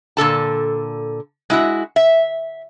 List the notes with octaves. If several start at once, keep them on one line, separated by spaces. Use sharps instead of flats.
A#2 D3 A4 A5
G#3 E4 F#4
E5